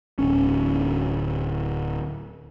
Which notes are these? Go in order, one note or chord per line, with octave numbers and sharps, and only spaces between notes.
D1 G1 C#4